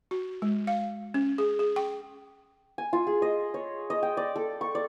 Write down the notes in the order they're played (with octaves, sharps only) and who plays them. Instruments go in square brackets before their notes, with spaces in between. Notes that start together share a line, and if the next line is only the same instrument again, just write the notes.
[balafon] F#4
G#3
F5
C#4
G#4
G#4
G5
[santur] G#5
F4
G#4
D#5
C#5
D#5
G5
D5
A4
C#6
D5